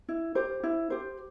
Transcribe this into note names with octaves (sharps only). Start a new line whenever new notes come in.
E4
G4 C5
E4
G4 C5